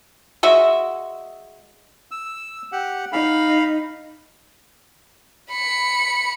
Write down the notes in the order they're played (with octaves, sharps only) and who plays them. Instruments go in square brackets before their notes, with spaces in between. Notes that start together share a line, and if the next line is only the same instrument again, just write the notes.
[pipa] G#3 F#4 E5
[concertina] E6
G4 F#5
[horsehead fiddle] D#4 [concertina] F5 B5
[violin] B5 C#7